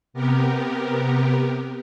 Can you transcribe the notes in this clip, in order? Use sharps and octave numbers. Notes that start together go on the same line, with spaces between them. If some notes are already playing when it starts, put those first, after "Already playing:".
C3 B3 G4 A#4